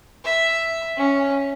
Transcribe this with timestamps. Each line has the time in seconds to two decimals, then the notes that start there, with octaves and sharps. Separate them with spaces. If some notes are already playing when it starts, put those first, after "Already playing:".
0.25 E5
0.97 C#4